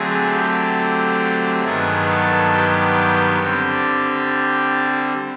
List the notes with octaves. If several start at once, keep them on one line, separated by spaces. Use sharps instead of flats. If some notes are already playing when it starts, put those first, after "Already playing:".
Already playing: D3 F#3 A3 C4 G#4
G4
G2 D#3 F#3 B3 G#4
A4
G4
D3 G3 C4